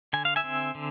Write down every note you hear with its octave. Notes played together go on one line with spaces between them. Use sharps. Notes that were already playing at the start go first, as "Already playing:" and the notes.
D3 G#5
F5
E5 G#5
C4
D3